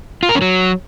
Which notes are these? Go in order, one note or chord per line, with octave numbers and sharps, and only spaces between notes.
F4
A#4
C#4
F#3